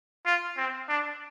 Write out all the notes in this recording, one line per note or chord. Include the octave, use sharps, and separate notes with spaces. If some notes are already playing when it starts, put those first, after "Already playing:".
F4
C4
D4